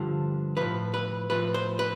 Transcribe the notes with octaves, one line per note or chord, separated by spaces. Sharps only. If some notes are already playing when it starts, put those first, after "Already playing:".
Already playing: G2 D3 F3
A2 F3 B4
B4
A2 F3 B4
C5
B4